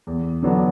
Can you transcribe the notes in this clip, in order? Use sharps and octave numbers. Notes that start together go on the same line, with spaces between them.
E2
D3 F#3 B3 D4